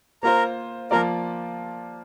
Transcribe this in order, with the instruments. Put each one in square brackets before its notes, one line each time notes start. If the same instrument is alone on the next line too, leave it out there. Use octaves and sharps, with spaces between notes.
[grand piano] A#3 F4 C5 [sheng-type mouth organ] A#4 A#5
[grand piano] F3 A#3 F4 D5 [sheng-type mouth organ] A#4 A#5